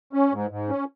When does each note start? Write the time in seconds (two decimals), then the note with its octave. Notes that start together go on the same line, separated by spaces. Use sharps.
0.13 C#4
0.32 G#2
0.51 G#2
0.69 C#4